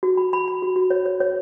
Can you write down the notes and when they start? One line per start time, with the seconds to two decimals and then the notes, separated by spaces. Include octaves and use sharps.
0.03 F#4
0.17 B5
0.33 B5
0.48 B5
0.62 F#4
0.76 F#4
0.90 C#5
1.05 C#5
1.20 C#5